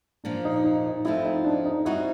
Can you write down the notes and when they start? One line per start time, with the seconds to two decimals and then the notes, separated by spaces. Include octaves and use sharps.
0.24 A#2 F3 A#3 D4
0.45 D#4
0.64 D#4
0.85 D#4
1.05 F3 A3 C4 E4
1.24 D#4
1.45 D4
1.65 D#4
1.85 G3 C4 D#4 E4 F#4